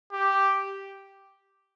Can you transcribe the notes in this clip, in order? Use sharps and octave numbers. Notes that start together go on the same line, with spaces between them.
G4